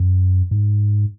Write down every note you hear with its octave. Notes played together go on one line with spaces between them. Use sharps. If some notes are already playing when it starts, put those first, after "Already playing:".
Already playing: F#2
G#2